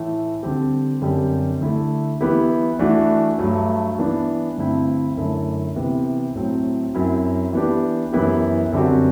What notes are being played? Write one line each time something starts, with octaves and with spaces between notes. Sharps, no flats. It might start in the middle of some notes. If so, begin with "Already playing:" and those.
Already playing: A2 E3 A3
D3 G3 C4 G4
F#2 D3 G3 C4 G4
D3 A3 E4
E3 B3 E4 G4
E3 A3 D4 F#4
G2 F#3 A3
E3 B3 D4
G2 D3 A3 C4 E4
F#2 D3 A3 E4
C3 E3 B3
A2 F#3 A3 C4
F#2 F#3 C4 E4
E3 B3 D4 G4
F#2 E3 B3 E4 G4
F#2 D3 G3 C4 F#4